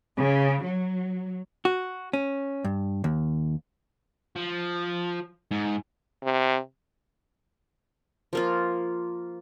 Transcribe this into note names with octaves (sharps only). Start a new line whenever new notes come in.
C#3
F#3
F#4
C#4
G2
D#2
F3
G#2
C3
F3 A#3 F4